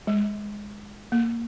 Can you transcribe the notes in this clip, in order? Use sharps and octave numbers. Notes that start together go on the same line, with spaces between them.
G#3
A#3